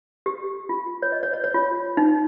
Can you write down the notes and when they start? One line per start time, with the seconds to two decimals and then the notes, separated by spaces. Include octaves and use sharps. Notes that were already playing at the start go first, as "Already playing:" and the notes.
0.26 G4
0.69 F4
1.02 C#5
1.12 D#5
1.23 C#5
1.33 C#5
1.44 C#5
1.54 F4
1.97 D#4